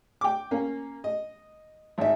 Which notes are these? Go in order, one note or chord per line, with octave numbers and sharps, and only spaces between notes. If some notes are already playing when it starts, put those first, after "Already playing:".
G5 D6
A#3 C#4
D#5
G#1 E5